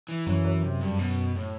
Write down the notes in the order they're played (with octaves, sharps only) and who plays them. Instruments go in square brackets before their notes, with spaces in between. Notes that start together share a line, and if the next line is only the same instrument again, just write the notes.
[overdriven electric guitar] E3
[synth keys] F#2 [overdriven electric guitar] E3
[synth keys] F#2
[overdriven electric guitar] C3
G2
B2
A2